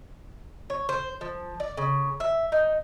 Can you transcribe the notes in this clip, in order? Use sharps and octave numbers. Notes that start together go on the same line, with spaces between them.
C#5
C5
F3
D5
C#3
E5
D#4